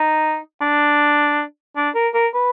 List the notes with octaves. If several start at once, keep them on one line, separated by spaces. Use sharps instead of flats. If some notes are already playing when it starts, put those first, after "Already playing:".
Already playing: D#4
D4
D4
A#4
A#4
B4